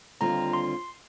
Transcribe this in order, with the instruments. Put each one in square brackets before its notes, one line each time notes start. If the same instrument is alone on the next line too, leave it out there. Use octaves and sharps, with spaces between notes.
[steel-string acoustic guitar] D#2 D3 G3 C4 F4 [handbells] A#5
[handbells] C6